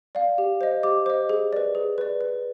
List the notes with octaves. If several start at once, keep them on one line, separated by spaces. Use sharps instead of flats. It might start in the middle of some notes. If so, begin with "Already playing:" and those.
D5 F5
G4
C5 D#5
G4 D6
C5 D#5
G#4
B4 D5
G#4
B4 D5
B4